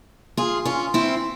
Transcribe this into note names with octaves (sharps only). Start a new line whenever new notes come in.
F4 G#4
C#4 F4
C4 E4